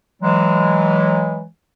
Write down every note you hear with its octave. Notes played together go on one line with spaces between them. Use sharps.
E3 F#3 G#3